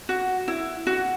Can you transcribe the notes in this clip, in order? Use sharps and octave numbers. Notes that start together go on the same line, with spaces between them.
F#4
E4
F#4